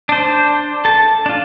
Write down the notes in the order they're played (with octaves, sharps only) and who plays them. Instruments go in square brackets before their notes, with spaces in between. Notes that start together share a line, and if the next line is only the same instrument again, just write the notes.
[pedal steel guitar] D4 C5
A4 A5
D4 F4